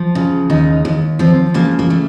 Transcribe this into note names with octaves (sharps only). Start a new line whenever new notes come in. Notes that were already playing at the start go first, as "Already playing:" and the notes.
Already playing: F3
C#3
D#2 D#4
D#2
F3 C4
C#3 A#3
A#3
A3